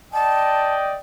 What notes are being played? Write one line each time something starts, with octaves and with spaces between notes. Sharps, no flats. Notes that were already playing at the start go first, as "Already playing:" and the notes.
D5 D#5 G5 A5